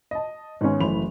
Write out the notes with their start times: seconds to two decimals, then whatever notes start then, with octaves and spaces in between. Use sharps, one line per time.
0.11 D#5 A5
0.61 G#2 D#3 B3 C#4 G#5
0.80 F#1 E3 A3 B5 F7